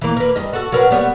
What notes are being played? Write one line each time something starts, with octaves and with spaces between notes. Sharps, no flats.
E3 A#3
A#4 B4
G2 D#5
F#4 A4
F#3 A#4 B4
G3 B3 C#5